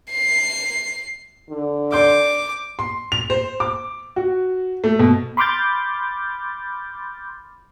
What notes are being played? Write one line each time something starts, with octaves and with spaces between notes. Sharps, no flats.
C7
D3
D5 C6 D6 G6
C6
F7
C5
D6
F#4
A3
B2
B5 C6 D6 F6 G6 A6